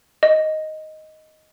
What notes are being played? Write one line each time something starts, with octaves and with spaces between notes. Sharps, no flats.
D#5